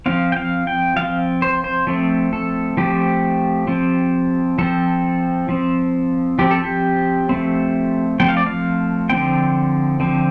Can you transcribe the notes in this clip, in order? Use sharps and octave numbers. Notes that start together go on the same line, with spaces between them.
F3 C4 F5
G5
F5
G5
F3 C4 F5
C5
C5
F3 A3 C4
A4
F3 A3 C4 G4
F3 C4
F3 C4 A4
F3 C4
F3 C4 G4
A4
G4
F3 A3 C4
F3 A3 C4 G5
F5
D5
F5
D3 F3 C4 G5
D3 F3 C4